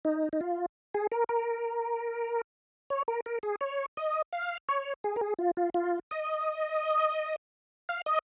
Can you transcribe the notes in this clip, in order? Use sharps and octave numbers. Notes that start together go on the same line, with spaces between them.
D#4
D#4
F4
G#4
A#4
A#4
C#5
A#4
A#4
G#4
C#5
D#5
F5
C#5
G#4
A#4
G#4
F4
F4
F4
D#5
F5
D#5